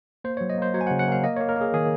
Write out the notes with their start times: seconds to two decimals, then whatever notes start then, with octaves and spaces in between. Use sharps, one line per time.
0.24 A#3 C5
0.37 C#5
0.41 F#3
0.50 D#5
0.58 A#3 C5
0.74 F#3 C#5
0.81 G#5
0.87 F#5
0.91 C#3
0.99 F#5
1.08 A#3 F5
1.24 A#3 D#5
1.37 C#5
1.41 A#3
1.49 A#4
1.57 A#3 G#4
1.73 D#3 G#4